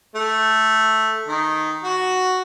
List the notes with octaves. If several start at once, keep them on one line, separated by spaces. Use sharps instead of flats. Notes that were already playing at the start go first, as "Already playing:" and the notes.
A3
D#3
F#4